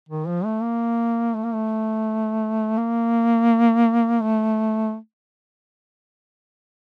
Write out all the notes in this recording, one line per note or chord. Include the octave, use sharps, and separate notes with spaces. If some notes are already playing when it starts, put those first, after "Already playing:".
D#3
F3
A3
A#3
A3
A#3
A3
A#3
A3